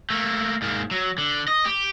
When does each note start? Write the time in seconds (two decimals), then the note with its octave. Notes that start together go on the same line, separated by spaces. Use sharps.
0.10 A3 A#3
0.62 G#2 A#3
0.91 F#3
1.18 D3
1.48 D#5
1.65 G4